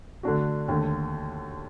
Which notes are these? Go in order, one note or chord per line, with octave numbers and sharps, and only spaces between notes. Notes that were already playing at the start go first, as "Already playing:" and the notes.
D3 A3 D4 F#4
D#2 D3 A3